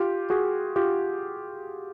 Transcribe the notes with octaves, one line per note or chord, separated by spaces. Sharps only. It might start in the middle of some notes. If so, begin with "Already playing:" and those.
Already playing: F4 G4
F#4 G#4
F4 G4